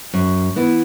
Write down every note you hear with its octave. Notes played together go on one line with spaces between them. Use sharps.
F#2
E3 B3 E4